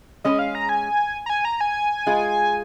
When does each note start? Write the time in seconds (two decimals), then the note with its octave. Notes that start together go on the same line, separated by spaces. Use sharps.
0.24 G#3 C#4 G#4 D#5
0.39 F5
0.55 A#5
0.69 G#5
1.26 A#5
1.30 G#5
1.45 A#5
1.61 G#5
2.07 G#3 F4 G#4